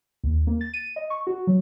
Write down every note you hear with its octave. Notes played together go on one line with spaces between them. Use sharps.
D#2
A#3
A6
D#7
D#5
C#6
F#4
F#3